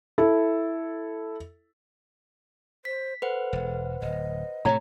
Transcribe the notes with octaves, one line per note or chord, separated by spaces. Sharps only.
E4 A4
C5 B6
A4 B4 C5 F#5
E1
D1 D#5
A2 C3 A3 C#5 A#5